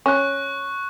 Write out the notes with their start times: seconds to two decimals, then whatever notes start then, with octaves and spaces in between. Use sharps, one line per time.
0.06 C#4 C#6 F#6